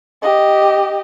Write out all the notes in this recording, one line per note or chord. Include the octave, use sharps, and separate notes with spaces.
G4 D#5